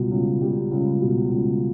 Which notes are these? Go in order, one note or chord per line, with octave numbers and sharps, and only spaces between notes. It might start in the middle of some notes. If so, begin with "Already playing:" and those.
Already playing: C#2 B2 G3
C#2
G3
C#2
B2
C#2